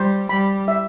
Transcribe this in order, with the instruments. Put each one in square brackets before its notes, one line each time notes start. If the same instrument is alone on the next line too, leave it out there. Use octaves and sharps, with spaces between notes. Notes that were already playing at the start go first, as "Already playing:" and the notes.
Already playing: [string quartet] G3 [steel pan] C5
[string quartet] G3 [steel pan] B5
[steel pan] E5